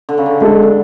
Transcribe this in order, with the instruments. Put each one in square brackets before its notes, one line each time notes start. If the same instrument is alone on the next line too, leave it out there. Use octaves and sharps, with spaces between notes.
[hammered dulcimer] D3
C#3
D3
[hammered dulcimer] D3 [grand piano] G#3 D4 A4